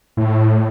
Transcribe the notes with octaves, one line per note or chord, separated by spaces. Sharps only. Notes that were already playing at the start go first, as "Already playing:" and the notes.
A2